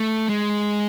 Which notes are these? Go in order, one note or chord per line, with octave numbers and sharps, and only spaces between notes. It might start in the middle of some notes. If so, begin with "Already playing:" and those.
Already playing: A3
G#3